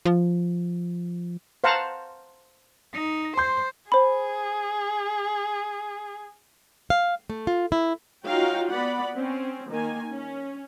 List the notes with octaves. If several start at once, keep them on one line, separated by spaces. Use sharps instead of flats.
F3
C5 F5 F#5 A5 A#5
D#4
C5 C6 G6
G#4 C5 B5
F5
A3
F4
E4
D#4 F4 F#4 C#5 F5 G5
B3 D5 F#5 B5
C4 C#4
D#3 A#3 G#5
C#4